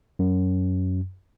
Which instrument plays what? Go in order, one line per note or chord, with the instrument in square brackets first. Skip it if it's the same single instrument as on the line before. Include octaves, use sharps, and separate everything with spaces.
[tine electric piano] F#2